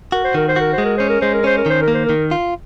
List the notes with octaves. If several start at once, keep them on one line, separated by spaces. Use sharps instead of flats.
F#4 A#4
C5
D#3 A#4
C5
F#4 A#4
G#3 C5
A#4
C#4 C5
A#4
G#3 C5
A#4
C#4 C5
A#4
D#3 C5
A#4
A#3
C5
D#3 A#4
F4